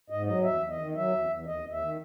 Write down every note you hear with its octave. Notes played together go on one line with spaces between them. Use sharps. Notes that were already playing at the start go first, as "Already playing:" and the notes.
G#2 D#5
F#3 D#5
E2 E5
E2
D#5
D#3
F#3 E5
E2
E2
D#2 D#5
D#2
E5
D#3